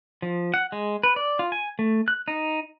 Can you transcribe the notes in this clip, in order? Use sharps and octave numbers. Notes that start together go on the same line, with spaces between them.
F3
F#5
G#3
B4
D5
F4
G#5
A3
F#6
D#4